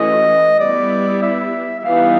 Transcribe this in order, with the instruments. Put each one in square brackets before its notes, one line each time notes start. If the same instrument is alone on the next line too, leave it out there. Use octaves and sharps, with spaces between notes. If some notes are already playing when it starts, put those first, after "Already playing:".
Already playing: [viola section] E3 A3 C#4 F#4 [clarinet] D#5
[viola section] G3 B3 E4 [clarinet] D5
[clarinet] E5
E5
[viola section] E3 G3 B3 D#4 [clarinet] F5